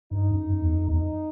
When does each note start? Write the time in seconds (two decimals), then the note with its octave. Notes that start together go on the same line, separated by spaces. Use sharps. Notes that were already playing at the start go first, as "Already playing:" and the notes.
0.11 G2 D#4
0.31 F#2
0.50 F#2
0.62 E2
0.75 F2
0.88 E2 D#4
0.97 F2